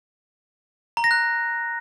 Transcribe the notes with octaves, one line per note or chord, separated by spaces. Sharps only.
A#5
A#6
F#6